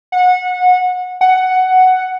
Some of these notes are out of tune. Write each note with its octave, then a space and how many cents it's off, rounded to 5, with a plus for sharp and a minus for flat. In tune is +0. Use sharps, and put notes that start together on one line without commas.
F#5 -25
F#5 +5